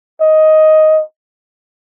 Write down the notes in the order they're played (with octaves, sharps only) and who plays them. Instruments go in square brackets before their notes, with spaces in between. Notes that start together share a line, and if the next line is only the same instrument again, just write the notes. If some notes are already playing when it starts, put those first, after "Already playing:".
[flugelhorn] D#5